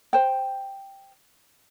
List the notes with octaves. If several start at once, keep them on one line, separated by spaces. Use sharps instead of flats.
C5 G5